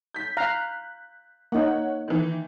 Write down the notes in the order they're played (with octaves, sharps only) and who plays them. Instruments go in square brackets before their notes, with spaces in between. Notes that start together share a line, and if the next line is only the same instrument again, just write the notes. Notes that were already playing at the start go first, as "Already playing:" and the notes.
[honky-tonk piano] G6 B6
[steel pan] F5 A#5 [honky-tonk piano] F#6
[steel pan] A#3 D#4 [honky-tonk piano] C#5 F#5
[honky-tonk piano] D#3 E3